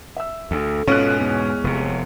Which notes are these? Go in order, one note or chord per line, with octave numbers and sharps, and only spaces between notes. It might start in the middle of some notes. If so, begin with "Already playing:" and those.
E5 E6
D2 A4
G#2 B2 C#4 F4 F#6
E2 G#3
F1 C3